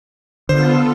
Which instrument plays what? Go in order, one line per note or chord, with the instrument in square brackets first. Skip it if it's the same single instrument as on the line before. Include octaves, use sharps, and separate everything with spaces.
[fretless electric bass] D3 [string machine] B3 F4 A4 [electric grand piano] C5